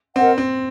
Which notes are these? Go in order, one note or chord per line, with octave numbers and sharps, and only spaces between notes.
C4 A#4 D#5 F#5
C4